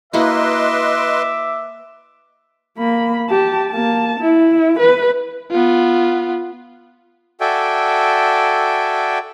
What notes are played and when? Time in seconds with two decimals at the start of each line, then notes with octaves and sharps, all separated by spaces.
0.13 A#3 E4 F#4 B4 D#5 E5 C6 D6
2.78 A#3 B5
3.29 G4 A5
3.71 A#3 A5
4.20 E4
4.79 B4
5.51 B3 F4
7.41 F#4 A4 D5 E5 G5 G#5